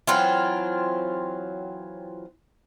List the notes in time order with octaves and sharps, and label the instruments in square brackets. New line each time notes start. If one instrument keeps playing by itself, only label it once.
[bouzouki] E3 F#3 C4 F4